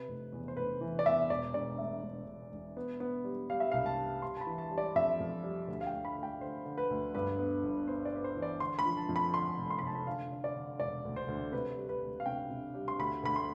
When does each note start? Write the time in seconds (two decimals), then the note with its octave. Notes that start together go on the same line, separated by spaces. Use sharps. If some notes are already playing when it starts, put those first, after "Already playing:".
Already playing: C3 B4
0.08 F1
0.32 E2
0.48 C5
0.57 F1 B4
0.81 E3
0.99 D5
1.06 E2 E5
1.30 E1 D5
1.54 E1 D5
1.78 A3 E5
2.03 E1
2.27 E1
2.52 E1
2.77 B3
3.00 B3
3.24 G3
3.50 G3 F5
3.60 E5
3.72 C2 F5
3.86 A5
3.98 G3
4.22 G3 C6
4.37 A5
4.41 B5
4.47 E3
4.58 A5
4.71 G3
4.78 D5
4.96 F2 E5
5.20 F2
5.44 G3
5.68 D2
5.81 F5
5.86 G5
5.92 D2
6.05 B5
6.18 D2
6.23 G5
6.41 D3 C5
6.66 D3
6.78 B4
6.90 D2
7.15 G2 B4
7.39 B3
7.64 G1
7.87 B3 C5
8.05 D5
8.12 B3 B4
8.24 C5
8.37 E3
8.42 D5
8.60 D3 C6
8.79 B5
8.86 F3
8.97 A5
9.09 F2
9.16 B5
9.34 D3 C6
9.58 F1
9.70 C6
9.79 B5
9.83 F1 A5
9.95 B5
10.07 D3 F5
10.32 D3
10.44 D5
10.56 D3
10.80 E1 D5
11.05 D2
11.16 C5
11.28 D2
11.52 C3 B4
11.77 G3
11.89 B4
12.02 D2
12.20 F5
12.26 C3 G5
12.50 C3
12.74 G3
12.88 C6
12.99 D2 B5
13.23 D2 B5
13.36 C6